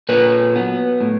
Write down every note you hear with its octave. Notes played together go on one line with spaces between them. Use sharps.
A#2 B4 C#5
F#3 B3
A2